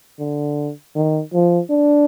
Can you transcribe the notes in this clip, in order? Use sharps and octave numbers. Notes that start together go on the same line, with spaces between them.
D3
D#3
F3
D4